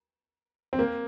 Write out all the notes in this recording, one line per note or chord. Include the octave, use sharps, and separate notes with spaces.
C4
A#3